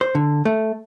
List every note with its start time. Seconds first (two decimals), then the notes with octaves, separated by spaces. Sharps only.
0.01 C5
0.15 D3
0.45 A3